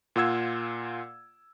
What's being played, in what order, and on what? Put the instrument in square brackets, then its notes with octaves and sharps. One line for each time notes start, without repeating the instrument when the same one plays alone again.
[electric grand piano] A#2 F4 F#5 E6 G#6